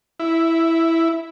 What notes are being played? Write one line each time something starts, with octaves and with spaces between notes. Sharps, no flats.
E4